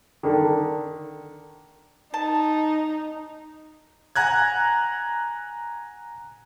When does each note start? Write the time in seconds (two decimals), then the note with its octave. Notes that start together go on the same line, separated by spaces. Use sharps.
0.23 D3 D#3
2.14 D#4 A5
4.16 F#5 G#5 A#5 F#6 G#6